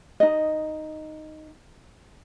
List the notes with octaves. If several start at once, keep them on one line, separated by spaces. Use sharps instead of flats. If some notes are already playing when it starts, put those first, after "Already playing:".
D#4 D#5